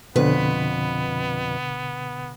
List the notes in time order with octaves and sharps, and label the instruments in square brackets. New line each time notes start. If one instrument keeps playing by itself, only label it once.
[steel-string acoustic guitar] F2 B4 [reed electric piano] B2 D3 [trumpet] B3